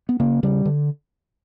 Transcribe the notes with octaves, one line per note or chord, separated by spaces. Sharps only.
B3
C#3 A#3
C#3 G3
D3